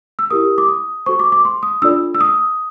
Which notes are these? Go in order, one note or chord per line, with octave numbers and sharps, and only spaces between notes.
E6
E4 G4 A#4 D#6
D6
D#6
F#4 A4 C5 C#6
D6
D6
C6
D#6
D4 F4 A4 D5 E6
E6
D#6